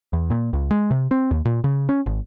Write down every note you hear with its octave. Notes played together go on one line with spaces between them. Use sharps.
E2
A#2
C#2
G#3
C3
C4
D#2
A#2
C#3
C#4
G#1